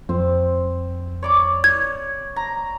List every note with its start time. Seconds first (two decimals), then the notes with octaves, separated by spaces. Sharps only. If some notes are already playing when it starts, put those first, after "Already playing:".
0.09 F2 C4
1.23 C#5 D5 D6
1.64 G#6
2.36 A#5